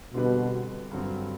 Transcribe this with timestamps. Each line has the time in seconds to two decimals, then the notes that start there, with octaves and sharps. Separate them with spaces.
0.14 B2 D3 G3 C4 G4 B4
0.91 G2 D3 F#3 C4